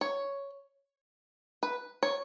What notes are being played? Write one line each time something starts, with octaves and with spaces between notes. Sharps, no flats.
C#5
B4
C#5